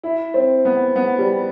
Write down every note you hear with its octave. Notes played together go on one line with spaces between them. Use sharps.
E4
C4
B3
B3
G3